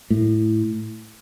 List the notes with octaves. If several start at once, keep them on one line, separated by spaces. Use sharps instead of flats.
A2